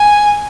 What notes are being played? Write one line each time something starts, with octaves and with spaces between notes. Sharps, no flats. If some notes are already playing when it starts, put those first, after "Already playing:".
Already playing: G#5